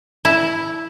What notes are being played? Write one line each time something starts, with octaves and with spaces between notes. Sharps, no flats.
E4